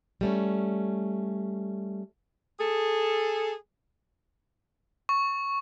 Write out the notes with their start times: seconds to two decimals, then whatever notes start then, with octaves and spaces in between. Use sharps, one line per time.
0.21 G3 A3 C#4
2.59 G#4 A4
5.09 C#6